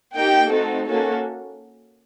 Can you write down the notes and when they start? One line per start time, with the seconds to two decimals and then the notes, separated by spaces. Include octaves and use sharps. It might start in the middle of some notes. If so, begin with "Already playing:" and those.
0.15 A#3 D#4 G4 G5
0.50 A3 C4 D#4 F#4 A4
0.86 A#3 C#4 F#4 A4